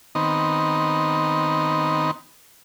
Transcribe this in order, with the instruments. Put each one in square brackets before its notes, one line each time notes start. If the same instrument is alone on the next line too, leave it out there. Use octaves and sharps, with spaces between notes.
[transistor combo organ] D#3 B3 C4 D#4